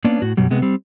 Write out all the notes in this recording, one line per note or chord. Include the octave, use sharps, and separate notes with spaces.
A#3 B3 C#4 D4 D5
A2 F#4
F#2 B2 F#3 G3
C3 G#3 B3
G3 C4